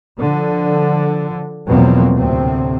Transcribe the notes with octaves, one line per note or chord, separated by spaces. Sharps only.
D3 F3
E2 B2 F3 F#3 A#3 C4
D2 A2 C3 C4